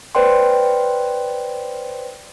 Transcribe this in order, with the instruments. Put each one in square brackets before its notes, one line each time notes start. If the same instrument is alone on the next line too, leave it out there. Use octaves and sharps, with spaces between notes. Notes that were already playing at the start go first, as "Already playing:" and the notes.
[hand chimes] B4 C5 D5 G5 C6